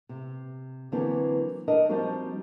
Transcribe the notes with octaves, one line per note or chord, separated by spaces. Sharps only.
C3
D3 E3 F#3 A#3 C4
D4 A#4 D#5
F3 G3 A#3 C4 D#4 F#4